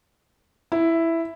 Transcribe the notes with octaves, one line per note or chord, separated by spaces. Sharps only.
E4